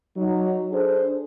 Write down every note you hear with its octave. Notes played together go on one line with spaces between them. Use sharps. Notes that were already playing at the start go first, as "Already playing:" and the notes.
F#3 D#4
D4 G#4 A4 C5